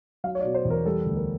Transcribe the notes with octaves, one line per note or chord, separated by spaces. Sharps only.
F#3 F5
C#5
D5
B2
C5
E2
A#4
G3 A4
D2
A#4